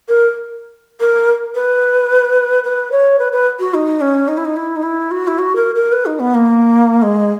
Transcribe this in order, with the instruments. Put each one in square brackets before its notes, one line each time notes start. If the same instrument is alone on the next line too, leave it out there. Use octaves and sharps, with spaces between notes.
[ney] A#4
A#4
B4
B4
C#5
B4
B4
F#4
D#4
C#4
D#4
E4
D#4
E4
D#4
E4
F#4
E4
F#4
A#4
A#4
B4
D#4
B3
A#3
G#3